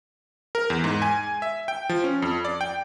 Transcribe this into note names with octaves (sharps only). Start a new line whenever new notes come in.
A#4
E2
G#2
G#5
E5
G5
F3
C#4
F2
D5
G5